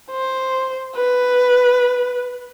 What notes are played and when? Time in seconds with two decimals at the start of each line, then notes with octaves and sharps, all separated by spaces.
0.12 C5
0.96 B4